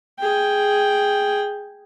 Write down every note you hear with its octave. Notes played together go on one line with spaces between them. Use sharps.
G#4 G5